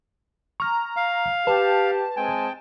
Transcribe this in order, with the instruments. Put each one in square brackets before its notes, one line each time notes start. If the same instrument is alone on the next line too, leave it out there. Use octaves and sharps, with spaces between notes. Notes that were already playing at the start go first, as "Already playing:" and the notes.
[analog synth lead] A#5 [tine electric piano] C#6 F6
[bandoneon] F5
[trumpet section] G4 [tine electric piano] B4 [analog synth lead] A5
[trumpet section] G#3 C4 G#5 [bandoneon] G5